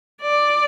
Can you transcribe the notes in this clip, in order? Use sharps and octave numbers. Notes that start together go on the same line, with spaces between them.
D5